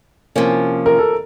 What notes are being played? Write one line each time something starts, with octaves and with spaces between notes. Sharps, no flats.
C3 F3 A#3 C#4
A#4
A4